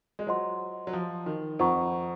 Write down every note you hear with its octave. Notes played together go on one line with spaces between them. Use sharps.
G#3
F#3 F4 C5 D#5 F#5 C6
F#3
F3
D#3
F2 F4 C5 F#5 A#5 C#6